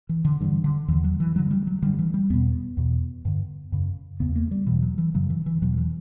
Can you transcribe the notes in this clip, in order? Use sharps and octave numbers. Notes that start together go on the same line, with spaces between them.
E3
D3
G2 D3 E3
D3
E2 D3 E3
F#3
E3
G2 D3 F#3
G3
F#3
G2 D3 G3
E3
G3
E2 B2 B3
E2 B2
G2 D3
F#2 C#3
E2 C#3 B3
A#3
G3
E2 B2 E3
F#3
E3
F#2 C#3 F#3
E3
E3
E2 B2 F#3
E3